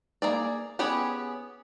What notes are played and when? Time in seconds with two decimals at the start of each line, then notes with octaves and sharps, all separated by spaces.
0.22 A#3 G#4 D5
0.79 B3 C#4 G4 G#4 C#5